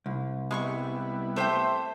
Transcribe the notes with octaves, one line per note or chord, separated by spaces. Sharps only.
C2
G3 G#3 B3 E4 C6 C#6
C3 A3 C5 E5 G5